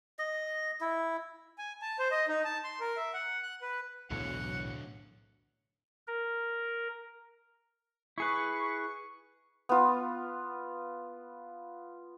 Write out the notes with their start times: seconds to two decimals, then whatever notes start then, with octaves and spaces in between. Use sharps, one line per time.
0.19 D#5
0.81 E4
1.58 G#5
1.82 A5
1.99 C5
2.11 D#5
2.28 D#4
2.44 A5
2.64 C6
2.80 A#4
2.97 E5
3.14 F#5
3.43 F#6
3.61 B4
4.10 B1 E2 A2 D3 E3 F#3 F#5
6.07 A#4
8.18 E4 G#4 B4 C#6
9.69 B3 F4